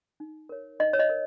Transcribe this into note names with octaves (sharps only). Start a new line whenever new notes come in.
D#4
A#4 C#5
D#4 D#5
C#5
D#5
A#4